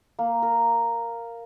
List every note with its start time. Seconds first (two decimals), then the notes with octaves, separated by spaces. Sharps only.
0.19 A#3
0.42 A#4